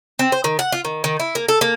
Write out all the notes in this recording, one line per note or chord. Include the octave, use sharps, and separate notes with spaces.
C4
C5
D#3
F#5
F4
D#3
D#3
E4
A#3
A4
A#3